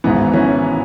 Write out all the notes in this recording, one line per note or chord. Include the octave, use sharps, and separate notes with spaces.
G#1 G#2 E3 B3
E3 C#4